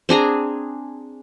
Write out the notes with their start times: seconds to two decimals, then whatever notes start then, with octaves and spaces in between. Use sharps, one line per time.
0.09 C4 D4 G#4 A#5